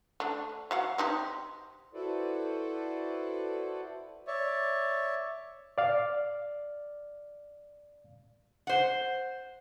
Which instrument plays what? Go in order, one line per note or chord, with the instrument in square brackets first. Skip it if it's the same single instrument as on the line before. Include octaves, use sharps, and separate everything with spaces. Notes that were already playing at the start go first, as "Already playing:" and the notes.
[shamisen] A3 D4
F#3 F5 F#5
C4 D#4 G4
[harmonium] E4 F#4 A4 B4 C5 D5
[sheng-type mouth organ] C#5 D5 E5
[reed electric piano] D5 F5
[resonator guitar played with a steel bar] C5 F#5